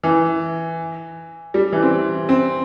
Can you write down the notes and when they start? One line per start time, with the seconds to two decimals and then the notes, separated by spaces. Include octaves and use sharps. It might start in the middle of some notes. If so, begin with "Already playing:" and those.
0.04 E3
1.54 G3
1.73 E3
1.82 C4
2.29 C4